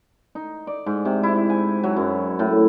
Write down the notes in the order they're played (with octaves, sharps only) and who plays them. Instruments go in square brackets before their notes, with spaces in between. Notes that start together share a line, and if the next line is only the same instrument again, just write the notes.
[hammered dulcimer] D#4
D5
G#2
C3
E4
G#5
F#3
F#2
A2